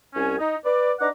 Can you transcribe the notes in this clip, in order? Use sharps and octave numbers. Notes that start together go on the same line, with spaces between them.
C2 C#4 G#5
D#4
B4 D5
D4 D#4 B4 F#5 A#5 D6